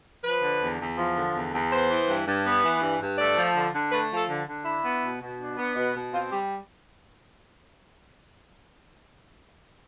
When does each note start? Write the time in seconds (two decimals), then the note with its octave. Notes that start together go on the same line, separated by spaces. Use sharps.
0.24 F3 B4
0.43 D3
0.60 E2
0.80 E2
0.98 F3
1.16 D3
1.35 E2
1.52 E2
1.71 B3 C5
1.89 E3
2.08 G2
2.27 G2
2.45 B3
2.64 E3
2.82 G2
3.00 G2
3.18 A3 D5
3.37 F3
3.55 D3
3.73 D3
3.92 A3 B4
4.10 F3
4.17 A4
4.29 D3
4.47 D3
4.65 D4 E4
4.84 B3
5.03 B2
5.21 B2
5.39 D4
5.57 B3
5.76 B2
5.94 B2
6.12 C4 F4
6.31 G3 G4